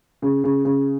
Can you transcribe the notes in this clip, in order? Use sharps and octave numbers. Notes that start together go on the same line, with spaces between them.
C#3
C#3
C#3